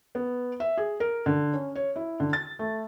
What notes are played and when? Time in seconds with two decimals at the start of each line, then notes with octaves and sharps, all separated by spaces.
0.15 B3
0.60 E5
0.77 G#4
1.00 A#4
1.26 D3
1.53 C#4
1.76 C#5
1.96 E4
2.20 D3
2.33 A6
2.59 A3